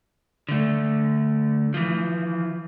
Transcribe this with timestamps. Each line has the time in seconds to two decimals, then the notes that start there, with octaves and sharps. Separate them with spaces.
0.49 D3 A3
1.74 E3 F3